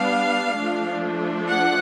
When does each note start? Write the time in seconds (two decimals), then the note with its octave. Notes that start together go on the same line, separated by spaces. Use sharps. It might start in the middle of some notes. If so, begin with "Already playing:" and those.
Already playing: G3 B3 D4 F5
0.56 F3 A3 D4
1.48 F#5